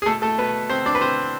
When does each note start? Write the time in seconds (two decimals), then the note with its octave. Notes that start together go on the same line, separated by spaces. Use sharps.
0.02 G#4
0.06 B2 A3 A4
0.22 A3 A4
0.38 B2 B3 B4
0.69 B2 C4 C5
0.86 D4 D5
0.95 B4
1.01 B2 C4 C5